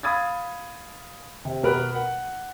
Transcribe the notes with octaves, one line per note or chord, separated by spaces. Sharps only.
F5 B5 D#6 G#6 A6
C3
B2 A#4 B4 F#6
F#5